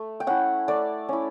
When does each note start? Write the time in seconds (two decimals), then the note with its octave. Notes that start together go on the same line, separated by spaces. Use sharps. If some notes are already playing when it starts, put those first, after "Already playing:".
Already playing: A3
0.20 G5
0.27 C#4 E4 F#5
0.68 A3 D5
1.09 C#4 E4